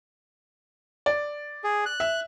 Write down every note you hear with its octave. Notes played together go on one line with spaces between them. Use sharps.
D5
G#4
F#6
E5